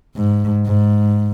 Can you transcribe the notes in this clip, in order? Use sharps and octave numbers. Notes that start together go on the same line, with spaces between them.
G#2
G#2